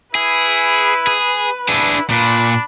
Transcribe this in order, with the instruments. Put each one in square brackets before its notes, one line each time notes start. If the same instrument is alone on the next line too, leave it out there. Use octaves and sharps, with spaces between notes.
[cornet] E4 [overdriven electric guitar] G#4 [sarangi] B4
[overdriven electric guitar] G#4
[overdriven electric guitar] D4 G#4 [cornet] E4
[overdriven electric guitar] A#2 [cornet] D4 [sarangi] B5